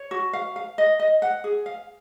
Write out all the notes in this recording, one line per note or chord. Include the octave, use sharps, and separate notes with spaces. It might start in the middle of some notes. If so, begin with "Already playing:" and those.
Already playing: C#5
F#4
F5
F5
D#5
D#5
F#5
G#4
F5